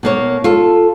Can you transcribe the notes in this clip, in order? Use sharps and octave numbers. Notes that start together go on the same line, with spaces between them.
B2 A#3 C#5
F4 A4